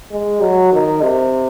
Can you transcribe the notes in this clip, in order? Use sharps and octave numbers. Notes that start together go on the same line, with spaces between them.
G#3
F#3
D#3
C3